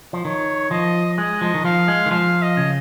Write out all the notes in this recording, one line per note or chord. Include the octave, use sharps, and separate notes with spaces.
F3
D#3 C#5
F3 D#5
G#3 D#5
F3
D#3
F3 F5
G#3
D#3
F3 F5
D#5
C#3